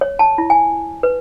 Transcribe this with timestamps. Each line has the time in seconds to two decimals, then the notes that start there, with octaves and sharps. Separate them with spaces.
0.01 C#5
0.19 A5
0.38 E4
0.50 G#5
1.03 B4